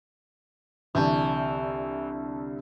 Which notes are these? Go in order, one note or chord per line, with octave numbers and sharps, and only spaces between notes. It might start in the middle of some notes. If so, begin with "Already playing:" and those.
C2 D3 E3 A5 C#6 D#6 G6